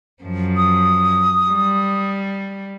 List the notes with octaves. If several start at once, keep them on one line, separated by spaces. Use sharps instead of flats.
F#2 F3
D#6
G3